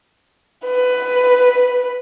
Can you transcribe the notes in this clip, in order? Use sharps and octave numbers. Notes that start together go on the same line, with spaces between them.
B4